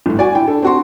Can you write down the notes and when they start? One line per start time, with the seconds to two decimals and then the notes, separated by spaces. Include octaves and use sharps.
0.06 G1 A2
0.19 F#4 D5 G#5
0.35 E4 G5
0.47 D4 A4
0.62 C4 F#4 C6